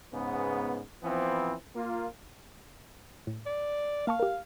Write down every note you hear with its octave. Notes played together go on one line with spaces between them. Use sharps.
G#2 C#3 B3
E3 F3 B3 C4
A#3 F4
A2
D5
A#3 F5 A5 C#6
G4 A#4